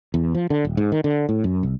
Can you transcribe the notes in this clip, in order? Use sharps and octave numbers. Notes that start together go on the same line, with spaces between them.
E2
F3
D3
D#1
G#2
D#3
D3
A2
F#2
C2